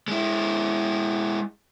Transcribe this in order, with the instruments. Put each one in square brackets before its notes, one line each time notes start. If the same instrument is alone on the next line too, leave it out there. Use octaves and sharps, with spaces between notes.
[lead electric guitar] G#3 E4